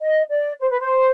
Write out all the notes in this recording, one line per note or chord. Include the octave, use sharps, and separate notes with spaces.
D#5
D5
C5
B4
C5